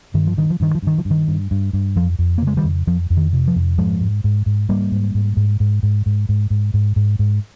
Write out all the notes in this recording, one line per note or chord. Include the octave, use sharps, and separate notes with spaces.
G2 D#3
F3
G2 D#3
F3
G2 D#3
F3
G2 D#3
F3
G2
D#3
G2
G2
G2
F2 F3
F2
A#3
C#3
G#3
D#3 G3
F2
F2 F3
F2
D#3
C3
F3
F2
G#2 F3 G#3
G#2
G#2
G#2
G#2 G3 A#3
G#2
G#2
G#2
G#2
G#2
G#2
G#2
G#2
G#2
G#2
G#2